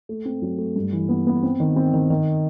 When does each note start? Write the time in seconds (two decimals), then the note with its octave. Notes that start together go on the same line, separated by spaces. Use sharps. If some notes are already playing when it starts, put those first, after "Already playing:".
0.09 A3
0.25 C4
0.42 F#3
0.58 A3
0.76 G2
0.93 E3
1.09 B3
1.27 B3
1.43 C4
1.60 D#3
1.76 C4
1.94 D#3
2.10 D#3